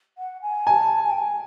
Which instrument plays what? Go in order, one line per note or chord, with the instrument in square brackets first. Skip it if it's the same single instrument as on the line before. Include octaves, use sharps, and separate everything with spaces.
[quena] F#5
G#5
[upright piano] G#5 [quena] A5
[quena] G#5
G5
G#5